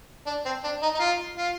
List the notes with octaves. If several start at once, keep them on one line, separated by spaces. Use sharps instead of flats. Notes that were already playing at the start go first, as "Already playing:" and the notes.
D4
C4
D4
D#4
D#4
F4
F4